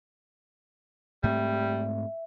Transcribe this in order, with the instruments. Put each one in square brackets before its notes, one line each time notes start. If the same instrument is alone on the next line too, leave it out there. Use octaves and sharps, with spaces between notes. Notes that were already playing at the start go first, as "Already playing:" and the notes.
[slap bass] G#2 A3 C4 [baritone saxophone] G3 [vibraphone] E5